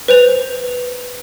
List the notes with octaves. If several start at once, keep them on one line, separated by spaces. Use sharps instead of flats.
B4 C5 F7